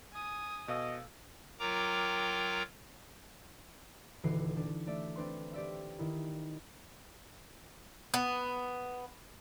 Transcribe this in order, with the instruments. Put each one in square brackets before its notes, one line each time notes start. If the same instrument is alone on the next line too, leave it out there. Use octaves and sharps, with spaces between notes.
[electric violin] G#5 D#6
[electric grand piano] B2 [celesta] A4 F5 E6 [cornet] D#5
[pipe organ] F#3 F4 A#4 G5 A#5 D6
[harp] D#1 D3 E3 F#4 C7
D4
A3 D5 E5
C4 D4 B4 C6
G4 D5 E5
D#3 E4
[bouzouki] B3